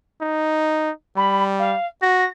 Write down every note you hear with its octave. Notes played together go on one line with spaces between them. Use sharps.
D#4
G3 B5
F5
F#4 A#6